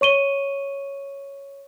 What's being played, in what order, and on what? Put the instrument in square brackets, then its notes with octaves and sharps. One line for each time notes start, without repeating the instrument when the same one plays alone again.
[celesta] C#5 C#6 D#7 G7